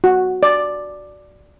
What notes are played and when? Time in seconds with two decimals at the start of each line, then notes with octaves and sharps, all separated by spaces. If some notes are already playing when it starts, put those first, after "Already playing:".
0.04 F#4
0.43 D5